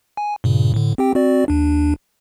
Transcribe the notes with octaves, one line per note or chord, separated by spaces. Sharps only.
G#5
G2 A#2 C#3
A2 D3
C4 G4 G5
C4 F#4 D5
D#2 D4